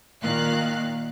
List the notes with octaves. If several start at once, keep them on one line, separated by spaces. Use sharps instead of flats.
A#2 D#3 F5 F#6